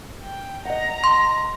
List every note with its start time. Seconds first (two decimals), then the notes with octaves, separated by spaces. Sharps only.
0.22 G5
0.65 D#5 F#5 A#5
1.04 C6